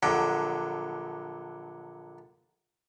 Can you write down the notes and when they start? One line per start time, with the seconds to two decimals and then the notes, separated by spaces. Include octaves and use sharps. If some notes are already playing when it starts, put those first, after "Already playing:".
0.03 A#1 D3 F#3 G5